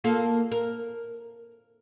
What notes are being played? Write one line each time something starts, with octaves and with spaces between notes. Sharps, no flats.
A#3 F4 A4
A#4